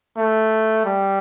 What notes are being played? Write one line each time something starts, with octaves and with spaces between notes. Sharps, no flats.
A3
G3